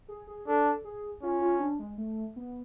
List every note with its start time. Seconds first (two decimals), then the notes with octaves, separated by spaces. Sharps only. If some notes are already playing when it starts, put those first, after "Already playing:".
0.08 G#4
0.27 G#4
0.47 D4 A4
0.85 G#4
1.23 C#4 F4
1.41 F4
1.60 D4
1.79 G#3
1.98 A3
2.36 B3